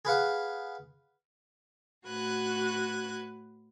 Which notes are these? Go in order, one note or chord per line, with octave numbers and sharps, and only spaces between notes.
G#4 B4 F5 F#5
A2 F#4 B4 F#6 G#6